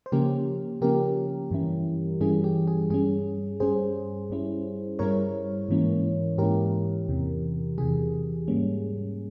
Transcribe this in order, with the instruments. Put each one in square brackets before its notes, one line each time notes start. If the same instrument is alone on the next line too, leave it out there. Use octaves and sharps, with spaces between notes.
[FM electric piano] C5
C#3 F3 A#3 C#4 G4 A#4
C#3 F3 A#3 C#4 G4 A#4
G2 E3 G3 C#4 E4
G2 E3 G3 C#4 E4 G#4
G4
G#4
G2 G3 C#4 G#4
G2 G3 C#4 G#4 C5
G2 G3 C#4 E4
G2 G3 C#4 E4 A#4 C#5
G#2 E3 A#3 C#4 E4
G#2 E3 A#3 C#4 E4 G4 A#4
E2 C3 E3
E2 C3 E3 G#4
G#2 G3 A#3 C#4